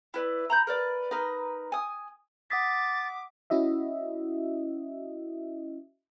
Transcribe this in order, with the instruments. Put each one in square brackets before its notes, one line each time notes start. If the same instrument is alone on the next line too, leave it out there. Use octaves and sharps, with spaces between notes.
[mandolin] E4 B4 D5
A#5 B5 G6
A#4 B4 D5
D#4 A#4 B4
G#5 D#6
[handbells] F#5 D#6 B6 [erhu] D6 [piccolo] A6
[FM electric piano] C#4 E4 F#4 D#5 E5